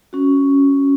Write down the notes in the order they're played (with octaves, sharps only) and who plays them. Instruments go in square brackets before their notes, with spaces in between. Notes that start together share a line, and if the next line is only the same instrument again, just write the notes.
[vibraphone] C#4 F#4